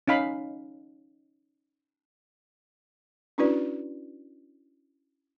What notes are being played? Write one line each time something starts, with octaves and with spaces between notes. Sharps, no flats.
C#4 D#4 F5 B5
C#4 D4 E4 F#4 B4 D5